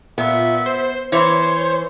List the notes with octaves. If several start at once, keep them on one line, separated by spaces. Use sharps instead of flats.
A#2 B3 E5
C5
E3 C5 C#5